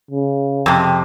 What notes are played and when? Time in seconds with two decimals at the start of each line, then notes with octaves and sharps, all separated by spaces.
0.11 C#3
0.66 F2 C3